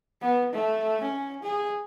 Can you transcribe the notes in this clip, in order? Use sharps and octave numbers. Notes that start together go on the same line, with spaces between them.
B3
A3
C#4
G#4